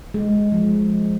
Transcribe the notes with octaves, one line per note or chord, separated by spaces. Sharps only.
G#3
F3